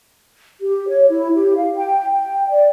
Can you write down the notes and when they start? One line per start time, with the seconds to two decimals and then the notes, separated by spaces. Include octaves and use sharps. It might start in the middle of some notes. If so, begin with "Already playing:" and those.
0.61 G4
0.88 C#5
1.09 E4
1.34 G4
1.56 F5
1.74 G5
2.12 G5
2.49 D5